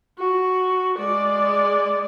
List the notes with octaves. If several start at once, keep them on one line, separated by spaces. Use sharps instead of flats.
F#4
G#3 D5